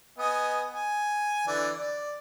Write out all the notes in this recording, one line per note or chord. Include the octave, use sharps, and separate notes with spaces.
B3 D#5 G#5
G#5
D3 E3 D5
D5